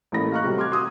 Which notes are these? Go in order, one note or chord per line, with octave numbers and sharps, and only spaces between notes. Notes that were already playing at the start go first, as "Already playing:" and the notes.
A1 E3 A#3 A4 B5 A#6
D#5 F5 A#5 C#6 F6 F#6
C3 F#3 G3 A3
C6 D6 F6 G#6
F#4 C6 D#6 E6